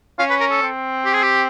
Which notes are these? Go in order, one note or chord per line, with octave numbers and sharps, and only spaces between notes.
C#4 F5
B4
A#4
A4
C4
G4
G#4
G4